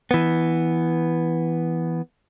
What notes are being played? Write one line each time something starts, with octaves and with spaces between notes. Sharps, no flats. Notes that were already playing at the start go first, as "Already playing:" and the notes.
E3 B3